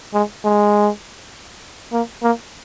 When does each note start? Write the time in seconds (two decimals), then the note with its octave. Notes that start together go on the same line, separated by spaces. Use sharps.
0.14 G#3
0.45 G#3
1.92 A#3
2.23 A#3